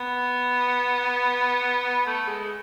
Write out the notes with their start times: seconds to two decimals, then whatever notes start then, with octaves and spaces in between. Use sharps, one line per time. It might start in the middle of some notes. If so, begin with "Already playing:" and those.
Already playing: B3
2.06 A3
2.28 G#3